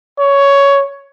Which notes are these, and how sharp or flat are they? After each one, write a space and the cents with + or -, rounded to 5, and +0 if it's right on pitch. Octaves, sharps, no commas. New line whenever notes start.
C#5 +10